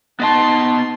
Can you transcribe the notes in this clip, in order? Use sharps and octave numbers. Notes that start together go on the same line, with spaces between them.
B3 D#4 D#5 A5 C6